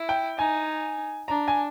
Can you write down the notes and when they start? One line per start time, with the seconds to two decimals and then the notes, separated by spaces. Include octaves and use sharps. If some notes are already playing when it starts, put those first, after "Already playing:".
Already playing: E4
0.09 G5
0.38 D#4 G#5
1.28 D4 A#5
1.48 G#5